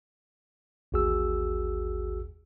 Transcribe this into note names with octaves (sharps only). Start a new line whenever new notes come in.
A1 D#2 F#4 G#4 E6